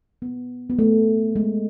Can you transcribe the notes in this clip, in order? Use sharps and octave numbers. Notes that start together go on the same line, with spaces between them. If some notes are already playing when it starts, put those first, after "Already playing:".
B3
B3
A3
G#3